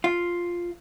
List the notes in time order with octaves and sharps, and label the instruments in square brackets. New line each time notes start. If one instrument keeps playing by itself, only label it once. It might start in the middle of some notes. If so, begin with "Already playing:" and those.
[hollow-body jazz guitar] F4